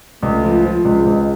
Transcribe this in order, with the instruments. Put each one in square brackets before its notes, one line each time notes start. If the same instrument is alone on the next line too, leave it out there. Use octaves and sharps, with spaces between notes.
[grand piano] C#2 [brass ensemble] A3
[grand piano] F3
F3
[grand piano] C#2 [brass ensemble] G#3
[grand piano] C#2